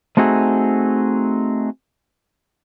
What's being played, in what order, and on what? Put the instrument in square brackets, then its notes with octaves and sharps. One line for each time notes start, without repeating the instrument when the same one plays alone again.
[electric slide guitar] A3 C4 D#4 F#4 G#4